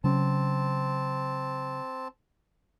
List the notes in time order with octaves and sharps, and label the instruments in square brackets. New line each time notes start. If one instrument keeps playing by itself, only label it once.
[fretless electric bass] C#3 F#3 C#4 [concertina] C4 A5